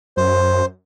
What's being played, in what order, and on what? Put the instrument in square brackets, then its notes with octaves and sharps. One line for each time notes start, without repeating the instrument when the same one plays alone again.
[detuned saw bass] F#2 [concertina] C5